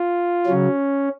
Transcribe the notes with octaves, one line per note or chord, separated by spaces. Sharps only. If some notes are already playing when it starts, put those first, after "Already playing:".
Already playing: F4
C#3 F#3 C#4